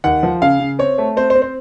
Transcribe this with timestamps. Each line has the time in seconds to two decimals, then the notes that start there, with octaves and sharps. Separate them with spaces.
0.04 D#2 F#5
0.23 F3
0.42 C#3 F5
0.60 C#3
0.79 C4 C#5
0.98 A3
1.17 C4 C5
1.30 C5
1.35 C4
1.42 C5